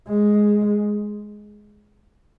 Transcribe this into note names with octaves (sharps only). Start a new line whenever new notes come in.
G#3